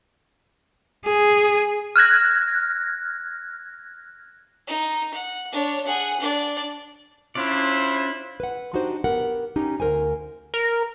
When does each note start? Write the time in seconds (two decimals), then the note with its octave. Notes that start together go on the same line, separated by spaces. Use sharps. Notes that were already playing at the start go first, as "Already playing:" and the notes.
1.06 G#4
1.96 F6 F#6 G#6 A#6
4.67 D#4
5.14 F#5
5.52 D4 C#5
5.85 G#4 F#5
6.20 D4 D5
7.35 C#4 D4 E4 F4 C5 D5
8.40 B4 F#5
8.73 D4 D#4 F#4 G4 C5
9.04 B3 G4 A#4 F#5
9.56 C#4 D#4 G4
9.80 D2 A#4 C5 G#5
10.54 A#4